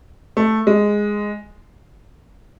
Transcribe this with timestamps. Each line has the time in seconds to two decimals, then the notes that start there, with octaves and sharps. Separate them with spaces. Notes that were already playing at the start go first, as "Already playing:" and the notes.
0.37 A3
0.67 G#3